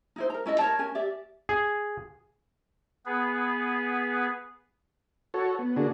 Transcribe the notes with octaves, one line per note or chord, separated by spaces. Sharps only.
D#4 E4 C5
A#4 A#5
C#4 E4 A4 D#5
A#4 C#5 A5
C#4 A#4 G#5
G4 D5 E5
G#4
B3 G#4 B4
F#4 A4 C#5
B3
D3 A#3 D4 F#4 G#4